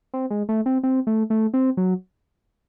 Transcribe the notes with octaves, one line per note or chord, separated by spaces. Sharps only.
C4
G#3
A3
C4
C4
A3
A3
C4
F#3